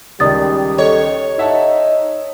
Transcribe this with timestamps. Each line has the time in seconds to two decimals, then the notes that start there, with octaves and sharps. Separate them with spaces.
0.20 C#2 D#3 G3 D5 D#6 A6
0.78 A4 C#5 D#5
1.39 D#4 E5 F#5 A5